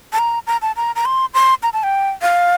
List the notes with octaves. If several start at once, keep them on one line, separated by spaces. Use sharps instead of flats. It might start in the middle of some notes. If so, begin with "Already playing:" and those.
A5
A#5
A#5
A5
A#5
A#5
C6
C6
A#5
A5
G5
F5